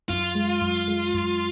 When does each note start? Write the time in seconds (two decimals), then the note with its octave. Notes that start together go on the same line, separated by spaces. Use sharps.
0.09 F#2 F4
0.35 G#3
0.61 F#2
0.88 G#3
1.14 F#2